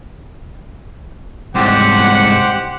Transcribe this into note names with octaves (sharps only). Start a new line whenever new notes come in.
C2 G#2 G4 C5 F#5